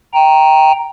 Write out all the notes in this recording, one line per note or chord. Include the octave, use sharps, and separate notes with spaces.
G5 A#5